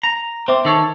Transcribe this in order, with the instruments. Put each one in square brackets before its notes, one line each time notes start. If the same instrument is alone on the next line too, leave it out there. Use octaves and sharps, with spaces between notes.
[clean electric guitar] A#5
[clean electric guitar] C4 [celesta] C5 E5 D6
[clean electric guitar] D#3 A4 C#5